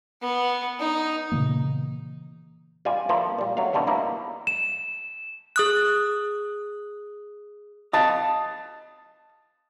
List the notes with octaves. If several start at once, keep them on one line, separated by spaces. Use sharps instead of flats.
B3
D#4
A#2 C#3 E3 A#3
G3 F4 D5 G#5
F3 A#3 E4 A4 C5
A#2 G3
F#3 A3 D4 F5
B2 D3 G3 A3 D4
A#3 D#4 E4
E7
G#4 D#6 F#6
D#5 F5 A5